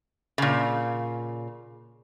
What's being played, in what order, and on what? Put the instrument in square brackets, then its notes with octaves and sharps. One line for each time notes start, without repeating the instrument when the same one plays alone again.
[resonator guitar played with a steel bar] A#2 C#3